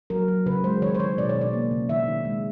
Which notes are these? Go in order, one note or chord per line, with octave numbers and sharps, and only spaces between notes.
F#3 A#4
F#3
C#3 B4
G#3 C5
D#3 C#5
C5
D#3 C#5
B2 D5
C#5
B2
D5
A#3
C#3
D#3 E5
D#3
G#3